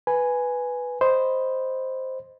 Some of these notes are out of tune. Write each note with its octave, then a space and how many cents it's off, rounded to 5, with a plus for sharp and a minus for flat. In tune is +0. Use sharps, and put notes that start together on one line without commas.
B4 +0 G#5 +0
C5 +0 D#5 +0 B5 +0